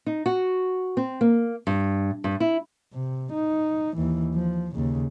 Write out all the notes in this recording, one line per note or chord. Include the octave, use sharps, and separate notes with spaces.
D#4
F#4
C4
A#3
G2
G2
E4
C3
D#4
D#2 E3
F3
D#2 C#3